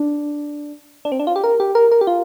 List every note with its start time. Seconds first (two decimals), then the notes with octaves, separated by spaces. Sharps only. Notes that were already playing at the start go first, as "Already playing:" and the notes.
Already playing: D4
1.05 D4
1.12 C4
1.20 D4
1.27 F4
1.36 G4
1.44 A#4
1.60 G4
1.75 A#4
1.92 A#4
2.01 G4
2.07 F4